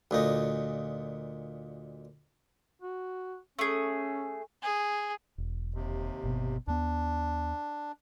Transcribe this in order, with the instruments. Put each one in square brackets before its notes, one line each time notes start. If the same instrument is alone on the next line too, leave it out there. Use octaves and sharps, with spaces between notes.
[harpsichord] D2 A#2 D#4
[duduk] F#4
[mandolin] A3 G#4 [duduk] C#4
[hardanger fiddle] G#4
[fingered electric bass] E1
[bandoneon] D#2 C3
[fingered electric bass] G1 B2
[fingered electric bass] D#2 B3 [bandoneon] D4